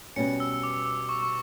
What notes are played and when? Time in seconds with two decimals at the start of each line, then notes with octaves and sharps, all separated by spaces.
0.16 B2 G3 C#4 C#7
0.40 E6
0.52 E6
0.63 D6
0.86 D6
1.09 C#6
1.22 C#6